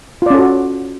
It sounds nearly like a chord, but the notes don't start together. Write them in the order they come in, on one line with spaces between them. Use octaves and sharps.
F4 D5 C#4 A4 F#4